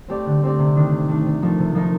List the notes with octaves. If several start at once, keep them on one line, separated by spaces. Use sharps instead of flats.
A3 C4 G4 D5
D3
A3 C4 G4 D5
C3
D#3 A3 D4
C3
D#3 A3 D4
C3
F3 A3 D#4 A#4
C3
F3 A3 D#4 A#4